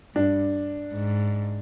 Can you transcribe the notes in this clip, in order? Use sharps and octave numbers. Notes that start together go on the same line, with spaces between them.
G2 D4
G#2